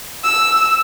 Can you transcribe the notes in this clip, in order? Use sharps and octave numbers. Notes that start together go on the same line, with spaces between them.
E6